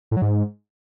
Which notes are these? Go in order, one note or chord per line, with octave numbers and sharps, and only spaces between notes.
A2
F#3
G#2